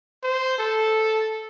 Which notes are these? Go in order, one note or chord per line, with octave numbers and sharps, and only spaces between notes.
C5
A4